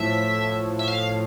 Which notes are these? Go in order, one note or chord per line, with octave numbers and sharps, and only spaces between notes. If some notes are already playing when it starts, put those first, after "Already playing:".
Already playing: A2 F3 E5
E5
F5